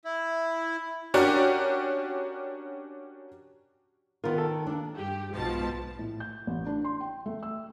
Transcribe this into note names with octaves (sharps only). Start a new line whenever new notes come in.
E4
C#4 D4 F#4 G4 A#4 D5
D#3 B3 F4 A#4
A4
D#2 D4
G2 G4
B1 G#2 B2 F3 A5
A2
G6
A1
D4
C6
G5
A3
E6